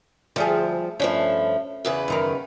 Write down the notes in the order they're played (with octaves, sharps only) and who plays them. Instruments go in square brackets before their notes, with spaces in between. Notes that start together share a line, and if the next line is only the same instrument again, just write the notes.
[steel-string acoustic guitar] D2 [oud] F3 G3 G#4
[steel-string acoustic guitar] G2 F3 A3 [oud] C#4
[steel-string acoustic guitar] E2 C#3 B4
[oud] F#2 D#3 A#4